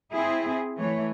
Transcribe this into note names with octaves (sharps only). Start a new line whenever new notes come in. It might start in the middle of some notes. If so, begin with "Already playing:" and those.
C4 E4 G#4
E3 A3 C#5